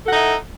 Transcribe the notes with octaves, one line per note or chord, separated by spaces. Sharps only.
D#4 E4 A4 F#5